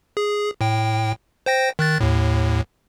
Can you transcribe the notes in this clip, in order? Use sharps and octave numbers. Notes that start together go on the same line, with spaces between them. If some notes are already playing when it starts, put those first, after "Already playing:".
G#4
A2 G5
C5 G5 A#6
D#3 F#6 A6
D#2 A2